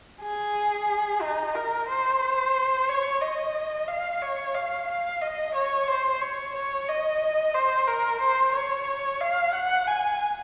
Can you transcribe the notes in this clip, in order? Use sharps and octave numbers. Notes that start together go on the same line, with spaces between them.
G#4
D#4
A#4
C5
C#5
D#5
F5
C#5
F5
F5
D#5
C#5
C5
C#5
C#5
D#5
C5
A#4
C5
C#5
F5
F#5
G#5